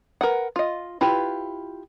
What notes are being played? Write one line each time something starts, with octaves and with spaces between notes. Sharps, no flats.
A#4 B4 F#5
F4 D#5
E4 F4 G4 B4